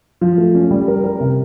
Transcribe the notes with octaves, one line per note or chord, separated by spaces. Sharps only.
F3
A3
C#4
G3
A#4
A#4
C3